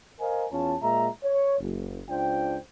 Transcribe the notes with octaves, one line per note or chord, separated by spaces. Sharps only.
A#4 C5 D#5 F5 G#5
E2 C#4 F4 A5
A#2 G#3 E5 A#5
C#5
F#1
C#2 D4 F4 C5 G5